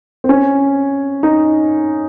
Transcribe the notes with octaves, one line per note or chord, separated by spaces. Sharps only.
C4
C#4
D#4